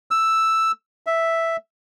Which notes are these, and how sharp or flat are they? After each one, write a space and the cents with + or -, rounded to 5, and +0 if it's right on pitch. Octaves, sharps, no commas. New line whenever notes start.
E6 +5
E5 +0